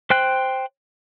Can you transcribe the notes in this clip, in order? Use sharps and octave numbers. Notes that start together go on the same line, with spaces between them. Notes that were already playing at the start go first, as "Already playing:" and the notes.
C5 G5 F#6